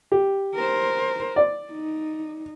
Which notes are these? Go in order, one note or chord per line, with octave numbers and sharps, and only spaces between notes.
G4
A#4 C5
D5
D#4